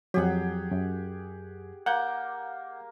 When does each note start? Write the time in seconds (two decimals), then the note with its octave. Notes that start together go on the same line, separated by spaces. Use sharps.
0.14 F2 F#3 G4 G#4 F#5
0.71 F#2
1.86 A#3 F#5 G6